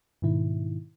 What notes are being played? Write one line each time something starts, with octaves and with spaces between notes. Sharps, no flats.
G#2 B2 D#3 E4